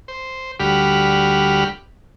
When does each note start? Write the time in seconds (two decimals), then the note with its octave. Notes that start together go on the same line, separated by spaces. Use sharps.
0.08 C5
0.60 D2 G3 F#4 G4 B5 F6